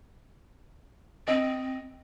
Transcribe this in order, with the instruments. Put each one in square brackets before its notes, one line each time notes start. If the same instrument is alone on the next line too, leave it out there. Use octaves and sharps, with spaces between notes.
[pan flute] C4 [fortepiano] D#5